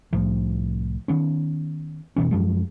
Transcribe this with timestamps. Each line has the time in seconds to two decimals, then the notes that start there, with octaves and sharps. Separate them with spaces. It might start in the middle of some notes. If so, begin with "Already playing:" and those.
0.13 C2 A2 F3
1.08 D#3 B3 C#4
2.16 F1 B2 E3 C#4
2.31 F#2 F3 G#3